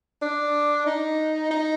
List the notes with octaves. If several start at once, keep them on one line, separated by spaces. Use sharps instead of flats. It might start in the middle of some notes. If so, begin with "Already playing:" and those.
D4
D#4
D#4